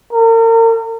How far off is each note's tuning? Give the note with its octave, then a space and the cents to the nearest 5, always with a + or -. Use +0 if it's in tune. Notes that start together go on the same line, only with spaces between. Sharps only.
A#4 -40